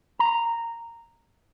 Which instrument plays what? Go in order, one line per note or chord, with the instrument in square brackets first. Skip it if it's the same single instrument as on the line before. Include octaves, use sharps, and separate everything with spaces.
[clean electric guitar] A#5